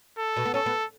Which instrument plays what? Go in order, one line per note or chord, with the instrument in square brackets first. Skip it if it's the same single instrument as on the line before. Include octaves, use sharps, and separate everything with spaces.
[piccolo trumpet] A4
[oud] B2
B3
[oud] C#4 [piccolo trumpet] A4
[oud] B3